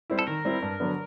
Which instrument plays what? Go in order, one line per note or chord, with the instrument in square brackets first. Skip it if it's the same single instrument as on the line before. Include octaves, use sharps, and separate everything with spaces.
[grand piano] G3 C4 E4
[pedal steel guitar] A4
[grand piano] D#3 [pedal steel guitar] A#4
[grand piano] G3 C4 E4
G2
D3 F#3 B3 D4